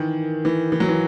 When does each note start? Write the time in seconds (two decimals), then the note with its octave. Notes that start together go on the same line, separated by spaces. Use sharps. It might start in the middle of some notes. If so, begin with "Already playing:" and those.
Already playing: D#3 E3
0.45 E3
0.72 E3
0.80 F#3
0.88 E3